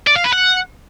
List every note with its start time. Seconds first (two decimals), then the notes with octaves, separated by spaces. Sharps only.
0.07 D5
0.16 F5
0.24 B4
0.33 F#5